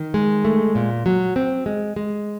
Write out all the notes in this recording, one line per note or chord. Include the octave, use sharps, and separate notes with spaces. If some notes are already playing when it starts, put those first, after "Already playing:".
Already playing: D#3
G#3
A3
A#2
F#3
C4
G#3
G#3